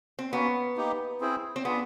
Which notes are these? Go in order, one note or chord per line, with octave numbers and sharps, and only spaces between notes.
C4
A#3 B3 C#4 F#4
A#3 D#4 G4
C4 E4 G#4 C5
C4
B3 D4 F4 G#4